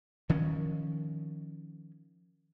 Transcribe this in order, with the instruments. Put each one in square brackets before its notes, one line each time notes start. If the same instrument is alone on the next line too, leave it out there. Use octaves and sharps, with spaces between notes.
[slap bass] D#3 F3 C#4